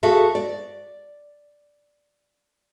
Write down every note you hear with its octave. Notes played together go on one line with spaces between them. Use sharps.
F#4 G#4 A4 E5 F5
D5